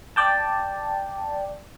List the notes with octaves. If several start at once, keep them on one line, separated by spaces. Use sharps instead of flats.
D5 G5 A5